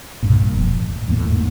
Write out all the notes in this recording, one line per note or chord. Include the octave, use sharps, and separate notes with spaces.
C2 G2 A#2
E1 F2
A1
E2 A2 A#3
E2 G#2